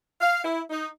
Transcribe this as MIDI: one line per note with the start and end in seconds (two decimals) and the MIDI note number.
0.21 0.40 77
0.44 0.61 64
0.70 0.87 63